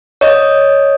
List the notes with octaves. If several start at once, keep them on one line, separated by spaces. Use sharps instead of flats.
C#5 D#5